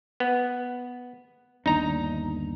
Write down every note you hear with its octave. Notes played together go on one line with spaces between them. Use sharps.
B3
G1 D#2 D4 D#4 A#5